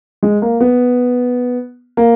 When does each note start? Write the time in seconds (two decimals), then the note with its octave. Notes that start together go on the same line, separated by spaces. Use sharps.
0.23 G#3
0.42 A#3
0.61 B3
1.97 A#3